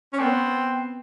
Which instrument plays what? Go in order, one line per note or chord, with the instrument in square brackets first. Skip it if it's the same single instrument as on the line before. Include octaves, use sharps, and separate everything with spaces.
[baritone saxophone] C#4
[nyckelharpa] B3 [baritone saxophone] C4